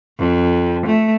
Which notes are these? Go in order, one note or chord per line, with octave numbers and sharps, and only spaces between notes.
F2
A3